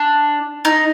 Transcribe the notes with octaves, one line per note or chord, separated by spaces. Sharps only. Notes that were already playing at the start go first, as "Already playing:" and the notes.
Already playing: D4
D#4